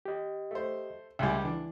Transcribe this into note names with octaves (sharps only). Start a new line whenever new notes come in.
G4 D#5
A3 C5
C#2 G3 E5 G#5 C6
E3 D4